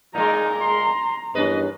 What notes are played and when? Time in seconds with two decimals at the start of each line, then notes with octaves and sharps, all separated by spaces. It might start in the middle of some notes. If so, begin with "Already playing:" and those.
0.15 A#2 G#3 D#4 A#5
0.61 C6
1.35 E2 G2 D#3 C#4 B4 D#5